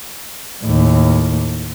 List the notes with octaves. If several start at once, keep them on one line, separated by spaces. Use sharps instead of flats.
D#2 A2